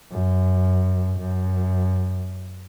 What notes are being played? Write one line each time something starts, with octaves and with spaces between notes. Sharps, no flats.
F#2
F#2